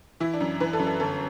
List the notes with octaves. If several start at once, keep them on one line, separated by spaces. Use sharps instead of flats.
E3 E4
D4
F#2
E3 B4
A4
F#2
A4
G1 A4